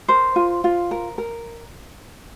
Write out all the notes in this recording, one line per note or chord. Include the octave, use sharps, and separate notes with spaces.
A#4 C5
F4
F4
A#4
A#4